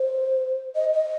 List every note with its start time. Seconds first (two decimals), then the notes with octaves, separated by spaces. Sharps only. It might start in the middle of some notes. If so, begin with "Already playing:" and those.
Already playing: C5
0.75 D#5
0.93 D#5